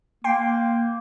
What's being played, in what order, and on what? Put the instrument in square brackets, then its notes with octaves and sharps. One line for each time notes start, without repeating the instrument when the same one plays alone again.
[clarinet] A#3 [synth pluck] G5 C6